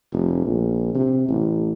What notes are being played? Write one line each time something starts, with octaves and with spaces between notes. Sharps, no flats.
F1
A#1
C3
A1